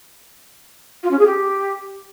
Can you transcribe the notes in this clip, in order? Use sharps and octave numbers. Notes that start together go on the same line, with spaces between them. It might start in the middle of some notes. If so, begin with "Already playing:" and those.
F4
C#4
G#4
G4